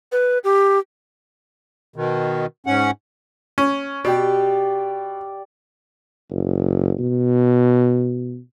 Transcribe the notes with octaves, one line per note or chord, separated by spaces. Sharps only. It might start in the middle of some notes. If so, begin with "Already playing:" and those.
B4
G4
B2 D#3
G#2 C#4 F#5
C#4
B2 G4 D5 G5
F#1
B2